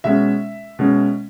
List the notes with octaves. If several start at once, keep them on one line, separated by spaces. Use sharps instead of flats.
B2 G#3 C#4 E5
B2 G#3 C#4